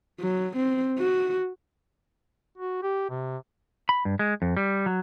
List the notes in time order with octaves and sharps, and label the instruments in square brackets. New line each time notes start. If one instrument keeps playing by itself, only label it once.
[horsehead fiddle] F#3
C4
F#4
[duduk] F#4
G4
C3
[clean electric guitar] B5
G2
G#3
F2
G3
F#3